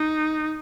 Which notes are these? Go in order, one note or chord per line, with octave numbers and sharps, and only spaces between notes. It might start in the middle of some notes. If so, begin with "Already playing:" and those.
Already playing: D#4